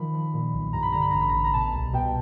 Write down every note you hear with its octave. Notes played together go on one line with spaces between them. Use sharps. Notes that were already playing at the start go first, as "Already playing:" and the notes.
Already playing: D#3 F3 B5
F3
A#2
B1
G2 A#5
B5
D3 A#5
B5
A1 A#5
B5
A1 A#5
A#5
B2 A5
C2
B2 G5